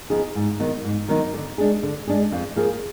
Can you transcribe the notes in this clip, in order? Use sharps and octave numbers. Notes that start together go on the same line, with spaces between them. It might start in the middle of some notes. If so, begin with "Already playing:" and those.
F3 B3 D#4 G#4
G#2
D#3 F#3 B3 D#4
G#2
D#3 F#3 B3 D#4
D3
G#3 D4 G#4
D3
G#3 D4 G#4
F2
F3 A#3 F4 G#4